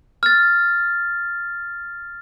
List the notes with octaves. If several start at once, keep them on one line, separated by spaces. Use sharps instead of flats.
F6 A6